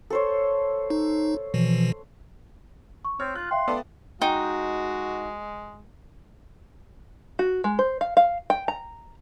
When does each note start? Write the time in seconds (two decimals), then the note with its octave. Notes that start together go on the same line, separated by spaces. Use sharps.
0.10 A4 C5 C#5
0.90 D#4
1.54 B2 E3 F3
3.05 C#6
3.20 C4 C#5 F6
3.36 F4 F#6
3.51 E5 F5 G5 C6
3.68 B3 A4 D5
4.21 G#3 D#4 F#4 G5
7.39 F#4
7.64 G#3
7.79 C5
8.01 F5
8.17 F5
8.50 G5
8.68 A#5